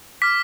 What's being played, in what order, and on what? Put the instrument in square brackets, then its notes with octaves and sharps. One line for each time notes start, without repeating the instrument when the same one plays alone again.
[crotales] D6 F6 B6